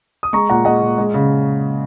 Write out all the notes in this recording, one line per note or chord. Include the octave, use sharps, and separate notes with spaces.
D#6
G#3 A#5 C#6
A#2 F#5 A#5
G#3 D#5 F#5
A#2
G#3
C#3